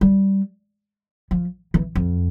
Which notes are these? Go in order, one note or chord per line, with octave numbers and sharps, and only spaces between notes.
G3
F3
E3
F2